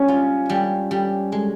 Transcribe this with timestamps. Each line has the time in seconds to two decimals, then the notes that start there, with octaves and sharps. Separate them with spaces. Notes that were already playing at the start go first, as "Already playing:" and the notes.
Already playing: G3 C#4
0.08 F4
0.50 G3
0.91 G3
1.32 G#3